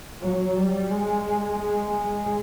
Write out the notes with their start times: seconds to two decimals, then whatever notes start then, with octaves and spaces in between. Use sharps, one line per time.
0.21 F#3
0.56 G3
0.90 G#3
1.59 G#3
1.94 G#3